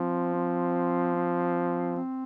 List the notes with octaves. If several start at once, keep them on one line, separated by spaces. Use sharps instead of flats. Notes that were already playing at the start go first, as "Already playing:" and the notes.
Already playing: F3 C4
C4
C4
C4